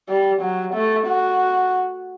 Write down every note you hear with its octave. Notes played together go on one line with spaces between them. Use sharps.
G3
F#3
A3
F#4